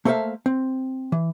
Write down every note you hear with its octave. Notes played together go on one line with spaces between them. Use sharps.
A3 A#3 A4 C5 E5 F5
C4
E3